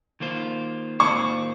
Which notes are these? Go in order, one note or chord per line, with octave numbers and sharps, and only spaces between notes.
D#3 A#3 F4 C5
D#3 A#3 F4 C5 C#6